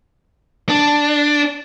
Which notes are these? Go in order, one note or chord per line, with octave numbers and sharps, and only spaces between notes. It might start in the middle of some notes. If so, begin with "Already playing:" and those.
D4